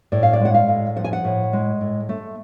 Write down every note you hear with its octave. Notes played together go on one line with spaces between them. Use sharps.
A2 D5
F5
D5
G#3 F#5
F5
A2
F3 F#5
G#5
F#5
A2
G#3
A2
A3